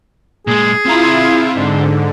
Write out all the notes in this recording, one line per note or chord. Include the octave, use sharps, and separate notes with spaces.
A#2 G#3 G#4
C4 E4 F4 A#5
G#2 D3